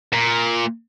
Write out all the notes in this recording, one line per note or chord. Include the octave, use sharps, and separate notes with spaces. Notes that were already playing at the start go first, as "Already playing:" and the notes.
A#2